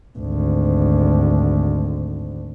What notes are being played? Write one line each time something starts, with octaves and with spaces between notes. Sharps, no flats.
G#1 D2